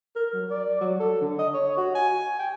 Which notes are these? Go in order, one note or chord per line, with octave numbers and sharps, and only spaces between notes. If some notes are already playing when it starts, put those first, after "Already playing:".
A#4
F#3
D5
F#3
A4
D3
D#5
C#5
F#4
G#5
G5